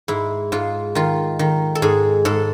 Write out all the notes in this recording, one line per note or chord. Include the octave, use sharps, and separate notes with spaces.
G#2 E4
G#2 F4
D#3 F4
D#3
A4
G#2 G#4
G#2 A4